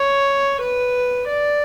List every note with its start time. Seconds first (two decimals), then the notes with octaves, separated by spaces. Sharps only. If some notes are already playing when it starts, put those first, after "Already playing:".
Already playing: C#5
0.61 B4
1.28 D5